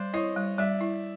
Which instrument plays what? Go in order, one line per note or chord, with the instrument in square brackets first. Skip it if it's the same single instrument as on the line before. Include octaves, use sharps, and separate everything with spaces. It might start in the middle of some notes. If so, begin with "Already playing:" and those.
Already playing: [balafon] G3 [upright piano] C5 D5
[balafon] E4 [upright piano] C#5 D#5
[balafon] G3
[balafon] G3 [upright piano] D5 E5
[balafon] E4